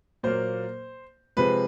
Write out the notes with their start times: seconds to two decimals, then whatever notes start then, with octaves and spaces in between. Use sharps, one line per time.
0.23 A#2 F#3 A#3 C5
1.37 C3 F3 G#3 B4